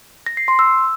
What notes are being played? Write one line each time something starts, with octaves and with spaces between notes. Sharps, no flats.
A#6
C7
C6
E6